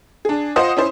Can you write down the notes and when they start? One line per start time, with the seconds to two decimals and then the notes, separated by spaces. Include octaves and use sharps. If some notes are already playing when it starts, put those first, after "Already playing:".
0.25 D4 G#4
0.56 F4 C5 D#5 F#5 D#6
0.77 C#4 E4 C5